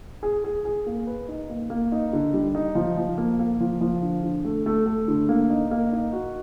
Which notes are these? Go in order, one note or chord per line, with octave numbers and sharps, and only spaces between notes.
G#4
G#4
G#4
A#3
B4
D#4
A#3
A#3
D#4
D3
G3
D#4
F3
F3
A#3
A#3
F3
F3
D3
D3
A3
A3
A3
D3
A#3
D#4
A#3
D#4
F#4